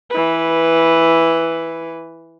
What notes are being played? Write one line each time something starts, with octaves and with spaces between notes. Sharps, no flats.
E3 B4